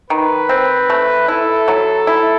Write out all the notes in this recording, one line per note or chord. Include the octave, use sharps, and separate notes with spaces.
D#3 B4
C4
A3
E4 A4
F#3
E4